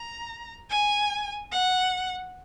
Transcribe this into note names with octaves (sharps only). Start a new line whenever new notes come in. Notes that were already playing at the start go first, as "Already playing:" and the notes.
Already playing: A#5
G#5
F#5